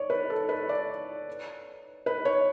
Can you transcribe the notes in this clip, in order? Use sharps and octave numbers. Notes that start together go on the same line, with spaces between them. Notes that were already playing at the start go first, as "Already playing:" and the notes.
Already playing: C#5 D5
B4
A4
B4
D5
B4
C#5